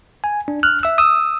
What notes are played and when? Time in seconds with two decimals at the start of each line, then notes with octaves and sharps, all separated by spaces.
0.24 G#5
0.48 D4
0.63 F6 F#6
0.83 E5 E6
0.98 D#6 E6